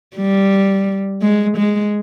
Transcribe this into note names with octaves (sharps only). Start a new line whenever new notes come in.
G3
G#3
G#3